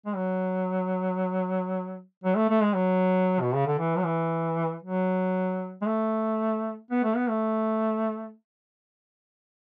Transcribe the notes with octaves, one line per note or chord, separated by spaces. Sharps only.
G#3
F#3
F#3
A3
A3
G#3
F#3
B2
C#3
D3
E3
F#3
E3
F#3
G#3
A3
B3
A3
B3
A3